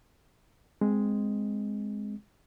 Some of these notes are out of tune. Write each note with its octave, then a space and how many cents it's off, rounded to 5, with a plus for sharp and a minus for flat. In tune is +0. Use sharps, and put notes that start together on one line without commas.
G#3 +0 C4 -5